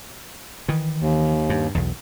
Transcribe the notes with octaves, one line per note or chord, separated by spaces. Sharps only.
D#3 E3
D#2
G2
B1 E2